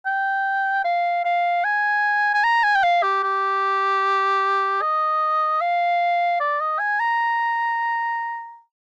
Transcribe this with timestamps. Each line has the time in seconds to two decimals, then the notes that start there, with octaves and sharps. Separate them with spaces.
0.06 G5
0.85 F5
1.25 F5
1.64 G#5
2.34 G#5
2.44 A#5
2.63 G#5
2.75 G5
2.83 F5
3.03 G4
3.23 G4
4.82 D#5
5.61 F5
6.40 D5
6.60 D#5
6.79 G#5
7.00 A#5